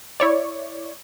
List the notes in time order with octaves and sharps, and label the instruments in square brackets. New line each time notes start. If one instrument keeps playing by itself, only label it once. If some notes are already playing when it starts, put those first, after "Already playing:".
[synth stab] E4 C#5 D5